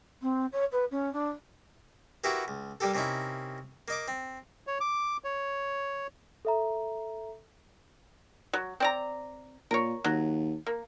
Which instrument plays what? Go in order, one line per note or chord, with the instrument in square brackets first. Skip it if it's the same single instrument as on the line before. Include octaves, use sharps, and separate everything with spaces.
[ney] C4
C#5
B4
C#4
D4
[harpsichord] A#3 B3 E4 F#4 G4 E5
C#2
G3 A#3 G4 A4
C3 A#3 C#4 D#4 E4
A#3 D#5 D6
C4
[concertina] C#5
D6
C#5
[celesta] A4 E5 A#5
[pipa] F#3
C4 D5 A#5
[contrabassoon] A#2 [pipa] A#4 C#5
[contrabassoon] D#2 [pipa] F#3
[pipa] A#3